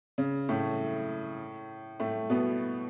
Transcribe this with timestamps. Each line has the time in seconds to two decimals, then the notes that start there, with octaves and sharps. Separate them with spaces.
0.18 C#3
0.49 A2 A3
2.00 A2 A3
2.30 B2 B3